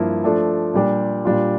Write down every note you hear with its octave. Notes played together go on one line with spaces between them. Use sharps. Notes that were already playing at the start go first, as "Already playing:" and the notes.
Already playing: G2 F3 A#3 E4
F3 A3 D4 A4
A#2 G3 D4 G4
A#2 G3 D4 F4